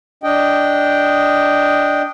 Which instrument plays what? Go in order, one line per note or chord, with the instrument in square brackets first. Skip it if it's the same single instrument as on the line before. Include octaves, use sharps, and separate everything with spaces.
[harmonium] D4 D#5 G5